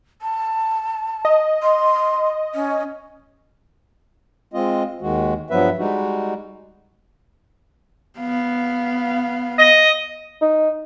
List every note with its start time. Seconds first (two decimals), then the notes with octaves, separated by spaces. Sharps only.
0.22 A5
1.25 D#5
1.63 C6
2.55 C#4
4.53 G#3 C4 F4 D#5
5.01 D#2 D#3 G#3 F#4
5.50 G2 F3 F#3 B3 B4 E5
5.78 G3 G#3 D#4 F#4
8.19 B3 F5
9.59 D#5
10.42 D#4